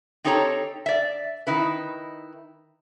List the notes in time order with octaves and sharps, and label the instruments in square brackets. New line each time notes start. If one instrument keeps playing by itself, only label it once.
[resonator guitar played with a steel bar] C4 D#4 G4 A4 C#5 A#5
D5 E5
D#3 D#4 E4 B4